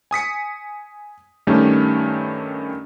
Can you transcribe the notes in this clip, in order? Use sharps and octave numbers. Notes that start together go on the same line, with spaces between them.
G#5 D#6 B6 C#7
G2 D#3 A3 C#4 G4